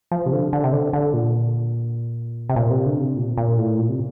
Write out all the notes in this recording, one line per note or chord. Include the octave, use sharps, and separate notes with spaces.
F3
C3
D3
D3
C3
D3
D3
A#2
C3
A#2
C3
D3
C3
A#2
A#2
A2
A#2
C3